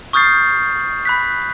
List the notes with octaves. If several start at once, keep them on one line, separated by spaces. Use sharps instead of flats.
C#6 D#6 F6 G6 A6 C7
B5 F#6 B6